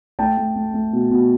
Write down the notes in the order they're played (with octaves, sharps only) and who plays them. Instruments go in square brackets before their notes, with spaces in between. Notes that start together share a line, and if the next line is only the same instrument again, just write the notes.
[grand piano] A3 G5 A5
A3
A3
A3
B2
B2